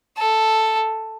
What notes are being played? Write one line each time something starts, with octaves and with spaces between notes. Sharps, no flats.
A4